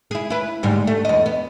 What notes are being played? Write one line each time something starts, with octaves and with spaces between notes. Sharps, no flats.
E4 G#4
E4 B4
D2 G#2 G3
A3
E2 D#5
B3